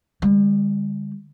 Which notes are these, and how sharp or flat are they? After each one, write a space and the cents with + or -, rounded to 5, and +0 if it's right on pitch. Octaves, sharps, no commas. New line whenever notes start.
D3 +0 G3 +45